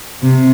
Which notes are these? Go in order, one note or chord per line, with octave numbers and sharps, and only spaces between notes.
C3